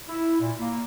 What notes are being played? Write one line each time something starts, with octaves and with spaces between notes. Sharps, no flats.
E4
A#2
A#3